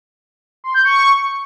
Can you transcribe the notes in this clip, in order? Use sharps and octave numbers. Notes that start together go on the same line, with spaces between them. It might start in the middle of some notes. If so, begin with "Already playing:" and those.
C6
G6
C#6